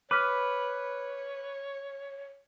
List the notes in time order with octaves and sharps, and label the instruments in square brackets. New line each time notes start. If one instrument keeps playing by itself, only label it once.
[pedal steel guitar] B4 [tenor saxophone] C#5 [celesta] D6 F6 B6